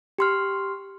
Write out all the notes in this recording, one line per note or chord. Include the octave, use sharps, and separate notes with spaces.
G4 C6 F6